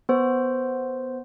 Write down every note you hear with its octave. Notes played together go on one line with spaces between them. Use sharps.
B3 C5